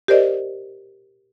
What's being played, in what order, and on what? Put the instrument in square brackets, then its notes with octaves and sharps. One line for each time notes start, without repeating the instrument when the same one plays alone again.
[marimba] G4 A#4 C5 D5 D#5